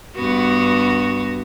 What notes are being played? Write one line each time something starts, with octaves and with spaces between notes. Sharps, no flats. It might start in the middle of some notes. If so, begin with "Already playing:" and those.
G2 B3 F#4